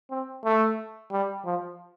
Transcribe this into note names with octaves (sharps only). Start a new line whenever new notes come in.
C4
A3
G3
F3